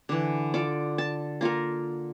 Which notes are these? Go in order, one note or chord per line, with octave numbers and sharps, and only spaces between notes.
D3 E3
F4 A4 D5
A5
A#3 F4 A4 A#4